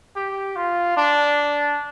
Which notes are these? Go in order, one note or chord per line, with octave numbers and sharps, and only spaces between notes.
G4
F4
D4